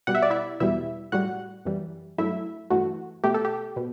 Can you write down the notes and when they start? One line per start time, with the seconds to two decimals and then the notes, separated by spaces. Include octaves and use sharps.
0.07 B2 G3 F#5
0.15 E5
0.22 D5
0.30 E4 E5
0.60 E2 B2 G3 E4 E5
1.12 A2 G3 F#4 F#5
1.65 F#2 E3 G3
2.18 G2 F#3 A3 E4 E5
2.70 G2 E3 A3 F#4
3.24 B2 A3 G4
3.34 A4
3.45 G4
3.76 B2